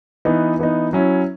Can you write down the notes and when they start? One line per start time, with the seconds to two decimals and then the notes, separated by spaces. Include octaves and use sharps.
0.25 E3 B3 D#4
0.59 E3 B3 D#4
0.93 F#3 C#4 E4